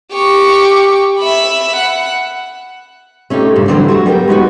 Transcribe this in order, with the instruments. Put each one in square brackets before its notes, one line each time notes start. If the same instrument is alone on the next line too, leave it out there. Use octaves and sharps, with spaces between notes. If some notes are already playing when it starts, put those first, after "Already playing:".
[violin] G4 C#6
E5 B5
F#5
[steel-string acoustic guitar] A3 C#4 D#4 F4 G4
G2 A#2 C#3
D3 E3 F#3 G3 C4 C5
F#3 A3 F#4
G3 B3 A#4 G5
G#3 B3 D#4 F#4